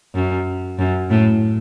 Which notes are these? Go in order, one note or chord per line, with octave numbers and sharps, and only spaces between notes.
F#2
F#2
A2